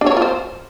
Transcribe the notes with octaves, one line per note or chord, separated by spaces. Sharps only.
D4
C#5
A#4
F4
C5